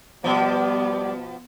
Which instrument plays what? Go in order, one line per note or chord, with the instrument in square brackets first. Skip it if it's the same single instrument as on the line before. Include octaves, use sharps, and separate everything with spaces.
[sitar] B2 F3 [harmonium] G3 D5 [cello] B3